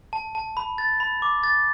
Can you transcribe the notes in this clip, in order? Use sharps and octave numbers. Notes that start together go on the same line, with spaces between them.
A5
A5
B5
A6
B5
D6
A6